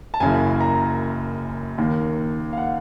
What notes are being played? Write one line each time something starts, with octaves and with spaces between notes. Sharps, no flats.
A5
F#1 F#2 C#3 E3 G#5
A#5
D#2 D#3
F5
F#5